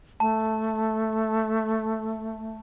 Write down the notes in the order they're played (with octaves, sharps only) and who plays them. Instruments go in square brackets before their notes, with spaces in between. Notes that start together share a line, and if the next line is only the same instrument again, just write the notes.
[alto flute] A3 [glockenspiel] A5